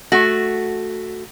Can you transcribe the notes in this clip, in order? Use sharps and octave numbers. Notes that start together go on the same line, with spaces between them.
A3 F#4